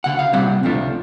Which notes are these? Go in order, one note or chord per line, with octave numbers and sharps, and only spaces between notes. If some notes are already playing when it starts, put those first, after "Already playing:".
D2 C#3 F#5
F5
C2 A#2 G3 C4 F#5
C#2 C3 F3 A3 D4